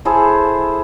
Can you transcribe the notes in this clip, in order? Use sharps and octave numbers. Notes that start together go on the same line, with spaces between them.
E4 G#4 A4 C5